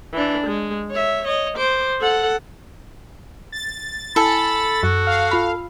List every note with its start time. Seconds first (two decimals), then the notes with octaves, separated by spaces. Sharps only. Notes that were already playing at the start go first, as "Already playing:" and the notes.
0.13 E3 D4
0.47 G#3
0.91 C#5 E5
1.25 C#5 D#5
1.57 C5 D6
2.00 A4 F#5
3.52 A6
4.16 E4 A4 G#5 B5
4.83 F#2 F#4
5.07 F5
5.31 F4 B5